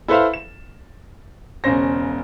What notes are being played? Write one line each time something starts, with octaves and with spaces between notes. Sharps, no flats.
E4 A4 B4 C5 E5 F5
E7
E1 C#3 C#4 C5 A#6